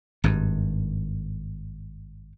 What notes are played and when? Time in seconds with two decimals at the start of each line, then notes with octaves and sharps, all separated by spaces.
0.24 G#1 G2